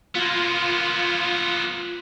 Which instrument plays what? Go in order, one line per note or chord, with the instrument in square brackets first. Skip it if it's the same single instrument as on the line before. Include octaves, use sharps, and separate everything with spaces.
[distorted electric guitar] A#3 B3 [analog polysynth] F4